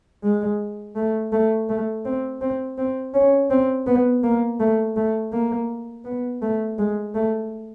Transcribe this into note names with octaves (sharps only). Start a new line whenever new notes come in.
G#3
A3
A3
A3
C4
C4
C4
C#4
C4
B3
A#3
A3
A3
A#3
B3
A3
G#3
A3